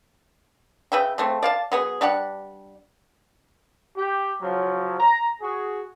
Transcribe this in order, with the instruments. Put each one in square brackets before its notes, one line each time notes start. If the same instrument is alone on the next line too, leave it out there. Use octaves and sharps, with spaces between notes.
[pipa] C#3 B4 E5 G5
C#3 A3 C4
D5 F5 A5
F#3 B3 G#4
G3 D4 G4 F#5
[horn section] G4
C#3 F3 F#3
A#5
F#4 G#4